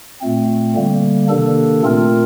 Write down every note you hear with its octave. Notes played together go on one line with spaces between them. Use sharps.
A#2 A3 C4
D3 G3 A#3
C3 D#3 A#3 D4 A4
A#2 A3 C4 F4 A#4